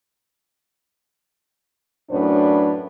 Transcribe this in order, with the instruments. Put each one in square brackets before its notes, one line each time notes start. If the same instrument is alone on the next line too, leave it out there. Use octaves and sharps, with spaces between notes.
[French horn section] F#2 A2 D4 B4 C#5